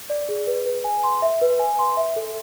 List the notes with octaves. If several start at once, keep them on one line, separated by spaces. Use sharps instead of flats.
D5
G#4
B4
B4
G#5
C6
E5
B4
G#5
C6
E5
A4